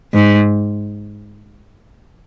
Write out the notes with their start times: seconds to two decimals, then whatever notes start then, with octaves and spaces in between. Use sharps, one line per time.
0.14 G#2